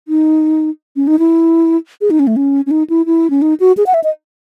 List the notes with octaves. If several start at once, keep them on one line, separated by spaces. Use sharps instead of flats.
D#4
C#4
D#4
E4
G#4
D#4
C#4
A3
C#4
C#4
D#4
E4
E4
C#4
D#4
F#4
G#4
F#5
E5
D#5